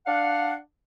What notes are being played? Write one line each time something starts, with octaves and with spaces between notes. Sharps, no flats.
D4 F5 F#5